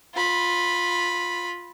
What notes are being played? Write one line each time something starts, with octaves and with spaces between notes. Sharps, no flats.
F4 B5